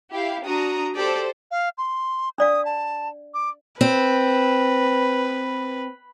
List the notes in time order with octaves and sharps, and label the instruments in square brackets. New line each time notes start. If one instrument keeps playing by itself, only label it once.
[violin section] E4 G4 F5
[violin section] D4 A#5 D#6 [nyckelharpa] F#4
[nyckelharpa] G4 D5 [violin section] A4 C5
[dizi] F5
C6
[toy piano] D4 D5 F5 [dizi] D#6
[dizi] A5
D6
[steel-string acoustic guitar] C4 [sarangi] B4